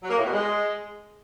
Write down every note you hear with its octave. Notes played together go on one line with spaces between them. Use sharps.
F#3
A#3
A2
B2
G#3